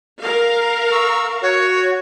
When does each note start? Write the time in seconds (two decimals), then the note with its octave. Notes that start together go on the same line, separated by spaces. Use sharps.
0.20 A#4 F5
0.92 C#6 E6
1.42 F#4 C#5